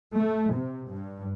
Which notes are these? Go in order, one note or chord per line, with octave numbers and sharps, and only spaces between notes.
A3
C3
G2